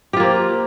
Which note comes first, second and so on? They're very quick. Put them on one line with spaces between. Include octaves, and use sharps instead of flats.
G4 F4 A#3 C4